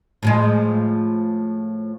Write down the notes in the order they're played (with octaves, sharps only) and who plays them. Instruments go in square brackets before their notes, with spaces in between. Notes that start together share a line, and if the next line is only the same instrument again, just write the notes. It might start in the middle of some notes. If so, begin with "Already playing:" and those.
[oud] A2 F3 G#3